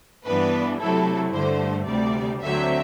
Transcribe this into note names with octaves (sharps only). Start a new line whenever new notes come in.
G2 E3 B3 D4 B4
C3 F#3 A3 E4 A4
G2 D3 A3 C5
D2 C3 G3 D5
D2 D3 F#3 C4 E5